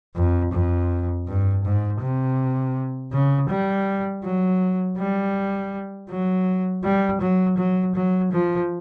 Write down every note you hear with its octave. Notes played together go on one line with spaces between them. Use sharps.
F2
F2
G2
G#2
C3
C#3
G3
F#3
G3
F#3
G3
F#3
F#3
F#3
F3